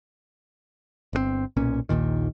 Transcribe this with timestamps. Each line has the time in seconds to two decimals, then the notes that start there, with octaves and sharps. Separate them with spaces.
1.13 G1 B2 C4
1.57 B1 A#2 C#4
1.89 A#1 D#2 A#2 D#3